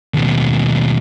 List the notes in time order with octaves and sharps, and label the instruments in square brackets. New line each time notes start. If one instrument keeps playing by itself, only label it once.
[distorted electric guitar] D#2 B2